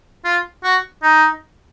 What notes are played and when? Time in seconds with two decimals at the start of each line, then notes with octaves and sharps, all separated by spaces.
0.25 F4
0.64 F#4
1.03 D#4